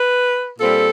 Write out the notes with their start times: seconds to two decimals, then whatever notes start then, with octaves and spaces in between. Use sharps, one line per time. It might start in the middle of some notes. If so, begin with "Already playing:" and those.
Already playing: B4
0.59 A#2 G3 C4 A4